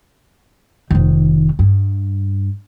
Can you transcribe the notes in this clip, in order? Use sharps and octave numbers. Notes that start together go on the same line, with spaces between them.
F1 D#3
G2